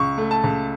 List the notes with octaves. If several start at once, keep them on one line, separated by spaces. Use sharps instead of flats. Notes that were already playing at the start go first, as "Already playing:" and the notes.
Already playing: C#2 C#6
A3
A5
C#2